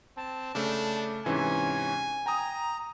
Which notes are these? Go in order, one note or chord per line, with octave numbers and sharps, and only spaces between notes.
C4 A5
C#3 A3 D4
G#2 C3 E3 C#4 G#5
G5 A#5 D#6